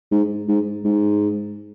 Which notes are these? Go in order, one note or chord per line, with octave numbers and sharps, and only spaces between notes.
G#2
G#2
G#2